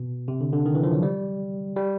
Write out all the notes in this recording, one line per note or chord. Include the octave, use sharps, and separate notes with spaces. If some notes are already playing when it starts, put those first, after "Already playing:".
Already playing: B2
C3
D3
D3
D#3
E3
F3
F#3
G3
G3